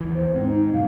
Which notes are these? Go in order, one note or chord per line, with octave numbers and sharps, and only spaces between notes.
D#2 E3
C5
G#2 C4
D#4
G2 B2 F#3 F5